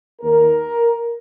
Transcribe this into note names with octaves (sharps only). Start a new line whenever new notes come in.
D#2 D#3 A#3 A#4